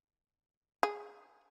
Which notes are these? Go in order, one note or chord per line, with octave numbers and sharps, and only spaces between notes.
G#4